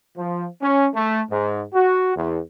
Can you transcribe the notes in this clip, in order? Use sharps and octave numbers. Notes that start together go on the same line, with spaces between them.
F3
C#4
A3
G#2
F#4
E2